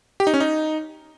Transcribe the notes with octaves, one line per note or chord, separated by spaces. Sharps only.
G4
D#4
C#4
D#4